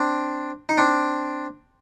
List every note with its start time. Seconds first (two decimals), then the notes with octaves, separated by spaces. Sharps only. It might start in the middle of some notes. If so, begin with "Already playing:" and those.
Already playing: C4 D4
0.69 D#4
0.77 C4 D4